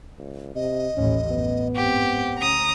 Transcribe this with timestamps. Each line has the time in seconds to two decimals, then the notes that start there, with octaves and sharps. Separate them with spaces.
0.19 C#2
0.55 C3 D#5
0.96 A1 D#2 A2 C#4
1.31 F#2 B3
1.76 G#2 C4 G4 F#5
2.38 D2 C#4 A#5 D#6